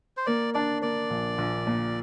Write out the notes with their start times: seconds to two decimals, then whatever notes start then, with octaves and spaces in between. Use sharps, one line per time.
0.17 C5
0.26 A#3 D5
0.54 D4 D5
0.82 A#3 D5
1.10 A#1
1.38 A#1
1.67 A#2